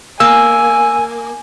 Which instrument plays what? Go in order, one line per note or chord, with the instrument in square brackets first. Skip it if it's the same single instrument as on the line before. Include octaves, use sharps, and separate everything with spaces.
[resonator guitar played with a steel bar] A#3 [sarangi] G#5 [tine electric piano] E6